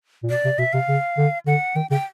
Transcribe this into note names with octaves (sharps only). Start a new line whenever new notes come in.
A#2
B2 D5
C3
B2 E5
C3 F5
C#3
D3
D3 F#5
D#3 G5
C#3 G5